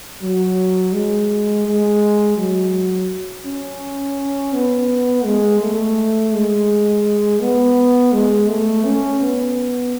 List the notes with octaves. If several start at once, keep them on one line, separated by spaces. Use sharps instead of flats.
F#3
G#3
G#3
F#3
C#4
B3
G#3
A3
G#3
B3
G#3
A3
C#4
B3